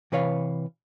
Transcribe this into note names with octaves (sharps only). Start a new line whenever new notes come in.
C3 E3 B4 C#5 F5